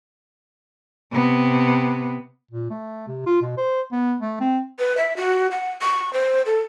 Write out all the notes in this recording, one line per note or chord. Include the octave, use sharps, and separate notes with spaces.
C3 B3
A#2
A3
C3
F4
B2
C5
B3
A3
C4
B4
E5
F#4
F#5
C#6
C5
A4